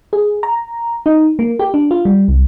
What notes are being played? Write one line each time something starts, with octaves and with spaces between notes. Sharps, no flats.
G#4
A#5
D#4
A#3
G4
D4
F4
G3
C2